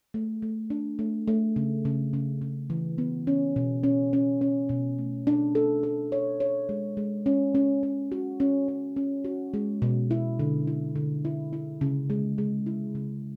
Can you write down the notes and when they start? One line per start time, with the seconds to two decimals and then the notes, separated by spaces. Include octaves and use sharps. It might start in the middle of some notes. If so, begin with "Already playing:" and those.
0.14 A3
0.42 A3
0.70 D4
0.99 A3
1.27 A3
1.56 C#3
1.85 C#3
2.13 C#3
2.42 C#3
2.70 E3
2.98 B3
3.27 C#4
3.56 B2
3.83 C#4
4.13 C#4
4.41 C#4
4.69 B2
4.98 A3
5.27 D4
5.55 A4
5.83 A4
6.12 C#5
6.40 C#5
6.69 G#3
6.97 G#3
7.26 C#4
7.55 C#4
7.83 C#4
8.12 F#4
8.40 C#4
8.68 C#4
8.96 C#4
9.25 F#4
9.54 G#3
9.82 B2
10.11 E4
10.39 D3
10.67 E4
10.96 D3
11.25 E4
11.53 E4
11.81 C#3
12.10 G#3
12.38 G#3
12.66 E4
12.95 C#3